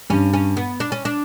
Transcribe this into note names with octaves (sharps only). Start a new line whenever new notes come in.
G2 C#4
C#4
B3
D4
C#4
D4